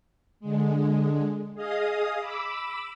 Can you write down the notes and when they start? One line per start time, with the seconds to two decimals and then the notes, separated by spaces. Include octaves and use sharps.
0.40 D3 G#3
1.55 G#4 D#5 F5 D#6
2.20 B5 D6 E6